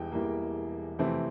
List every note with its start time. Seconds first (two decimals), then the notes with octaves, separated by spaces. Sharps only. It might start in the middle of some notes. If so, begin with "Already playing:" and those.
Already playing: E1 E2 E3 G3 G5
0.12 E1 E2 E3 G3 A#3
0.99 F2 C3 E3 A3 C4